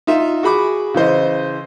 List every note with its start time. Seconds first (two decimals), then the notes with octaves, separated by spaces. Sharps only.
0.07 D#4 F4 E5
0.43 F#4 G#4 B5 D6
0.94 C#3 E3 C5 D#5